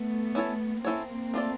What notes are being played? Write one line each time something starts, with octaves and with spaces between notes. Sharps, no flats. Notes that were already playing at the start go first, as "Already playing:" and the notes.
Already playing: A3 B3
C#4 E4 A4 C#5
A#3 C4 C#4 E4 A4 C#5
A3 D4 F4 A4 D5